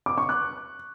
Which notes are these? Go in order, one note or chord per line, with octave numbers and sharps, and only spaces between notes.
D6
C#6
F#6